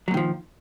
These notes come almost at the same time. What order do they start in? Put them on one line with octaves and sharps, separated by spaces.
F#3 A#2 D#3 F3